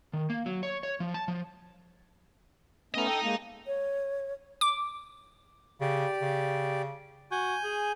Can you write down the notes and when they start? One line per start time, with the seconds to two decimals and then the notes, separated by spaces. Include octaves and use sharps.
0.13 D#3
0.30 A#3
0.46 F#3
0.63 C#5
0.83 C#5
1.00 F3
1.14 A5
1.28 F3
2.94 A3 B3 C#4 D#5 A#5
3.07 A4 G5
3.22 G#3 A#3
3.67 C#5
4.61 D6
5.81 C#3 G4 D5
6.22 C#3
7.32 F#4 G#5 G6
7.64 G#4